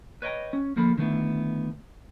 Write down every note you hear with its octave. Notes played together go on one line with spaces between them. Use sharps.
B4 C#5 D#5 F#5 G5 A#5
C#4
D2 F3 A#3 A4 B5
D3 D#3 A3 B3 E4